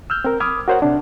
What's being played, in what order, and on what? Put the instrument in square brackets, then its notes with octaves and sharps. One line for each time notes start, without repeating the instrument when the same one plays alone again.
[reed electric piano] E6 F6 G6
C4 A#4
B5 D6 D#6 F6 G#6
F#4 A#4 C5 C#5 F#5
C3 D4